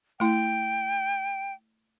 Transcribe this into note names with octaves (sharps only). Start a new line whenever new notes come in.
A3 E4 G5